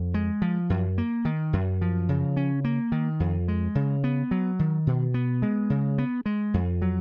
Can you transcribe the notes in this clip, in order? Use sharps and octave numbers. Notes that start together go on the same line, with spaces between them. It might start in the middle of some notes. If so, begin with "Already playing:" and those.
Already playing: F2
G#3
F3
F#2
A#3
D#3
F#2
F3
C#3
C#4
A#3
D#3
F2
G#3
C#3
B3
F#3
D#3
B2
B3
G#3
C#3
B3
G#3
F2
F#3